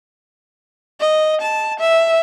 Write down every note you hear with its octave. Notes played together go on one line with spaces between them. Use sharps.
D#5
A5
E5